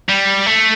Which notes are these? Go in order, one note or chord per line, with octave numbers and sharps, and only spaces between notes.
G3
A3